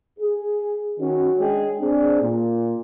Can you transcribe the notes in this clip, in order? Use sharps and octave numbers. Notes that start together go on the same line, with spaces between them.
G#4
D#3 C#4 F#4
G#3 D4 G#4 C#5 D#5 G5
C4 D4 G#4
A#2